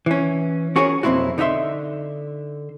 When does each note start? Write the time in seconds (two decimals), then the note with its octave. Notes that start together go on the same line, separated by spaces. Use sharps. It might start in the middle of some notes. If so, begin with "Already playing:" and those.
0.06 E3 C#4
0.76 C#4 F#4 G#4 A#4 C#5
1.03 B1 F2 A#3 C4 E4 F#4
1.38 D3 D#4 G#4 E5 C6